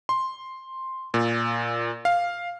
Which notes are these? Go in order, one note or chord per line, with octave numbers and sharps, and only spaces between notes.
C6
A#2
F5